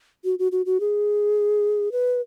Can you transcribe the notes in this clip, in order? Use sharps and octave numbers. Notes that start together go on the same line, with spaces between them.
F#4
F#4
F#4
F#4
G#4
B4